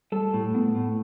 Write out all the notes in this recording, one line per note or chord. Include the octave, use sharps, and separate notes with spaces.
G3 A4
A2
B3
A2